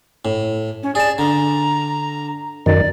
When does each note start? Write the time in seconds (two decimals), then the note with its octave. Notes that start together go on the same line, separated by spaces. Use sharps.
0.25 A2
0.83 C#4
0.95 G#4 D5 A5
1.18 D3 A#5
2.66 F#2 D#3 D5